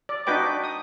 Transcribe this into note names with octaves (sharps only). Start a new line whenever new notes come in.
D5
D4 D#4 F#4 B4 G5 D6
D#6